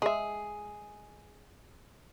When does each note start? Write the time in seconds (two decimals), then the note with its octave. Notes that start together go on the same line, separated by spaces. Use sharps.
0.02 G#3 G#4 E5